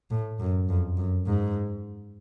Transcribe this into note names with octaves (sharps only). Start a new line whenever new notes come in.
A2
F#2
F2
F#2
G#2